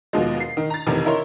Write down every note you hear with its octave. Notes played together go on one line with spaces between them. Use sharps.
D#2 B2 F3 G#3
C7
D#3
A#5 A6
F1 C3 D#3 E3
D#4 E4 A#4 C#5 C6